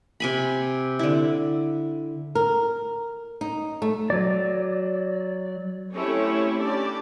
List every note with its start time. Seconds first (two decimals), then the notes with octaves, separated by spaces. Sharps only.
0.20 C3 G#5 B5
0.99 D3 E4
2.35 A#4
3.41 D#4
3.82 A3
4.10 F#3 D5
5.94 A3 C4 C#4 E4 G4 C#5
6.59 C#4 D4 G4 D5